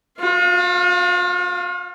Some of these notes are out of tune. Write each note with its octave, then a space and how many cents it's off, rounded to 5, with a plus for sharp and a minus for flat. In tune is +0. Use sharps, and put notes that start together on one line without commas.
F4 +45 F5 +0